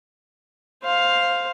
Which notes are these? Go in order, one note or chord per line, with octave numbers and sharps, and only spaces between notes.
C5 F5